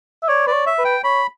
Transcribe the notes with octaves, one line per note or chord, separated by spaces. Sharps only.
E5
C#5 D5
B4 D5
C#5
E5
B4
G5
C#5 B5